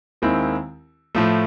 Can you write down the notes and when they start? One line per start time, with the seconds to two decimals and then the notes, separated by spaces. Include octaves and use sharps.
0.22 D#2 D#3 G#3 C4 E4
1.15 A2 F3 A3